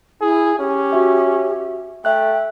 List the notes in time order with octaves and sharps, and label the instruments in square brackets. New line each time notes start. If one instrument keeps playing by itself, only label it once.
[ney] E4 [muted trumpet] G#4
[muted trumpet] C#4 [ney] G4
[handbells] F#4 E5
[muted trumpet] A3 [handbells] E5 F#6 [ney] G5